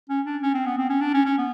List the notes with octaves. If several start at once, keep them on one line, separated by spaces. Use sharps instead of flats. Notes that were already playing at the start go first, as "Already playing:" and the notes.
C#4
D4
C#4
C4
B3
C4
C#4
D4
C#4
C#4
B3